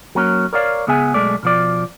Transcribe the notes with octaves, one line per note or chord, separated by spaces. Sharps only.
F#3 A#3 C#4
A#4 C#5 D5 F5
C#2 C#3 B3 G#4 E5 G#5
B1 G#3 A3 D5
B2 F3 D5